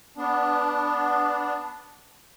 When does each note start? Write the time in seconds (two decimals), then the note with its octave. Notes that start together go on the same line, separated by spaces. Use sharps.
0.17 B3 D4